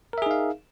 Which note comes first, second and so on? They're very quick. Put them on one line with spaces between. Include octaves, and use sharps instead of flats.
A#4 E5 G#4 D#4 F5